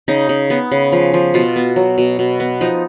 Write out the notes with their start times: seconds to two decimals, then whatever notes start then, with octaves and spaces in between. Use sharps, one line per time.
0.08 C#3 D#4
0.29 C#3
0.50 B3
0.72 C#3
0.92 F3
1.14 F3
1.34 B2 F4
1.56 B3
1.76 F#3
1.98 B2
2.19 B2
2.40 B3
2.61 F3 D#4